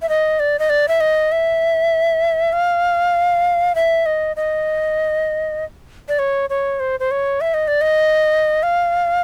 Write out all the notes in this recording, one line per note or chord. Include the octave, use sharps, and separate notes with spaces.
E5
D#5
D5
D#5
D5
E5
D#5
E5
F5
E5
D#5
D#5
D5
C#5
C#5
C5
C5
C#5
E5
D#5
D5
D#5
F5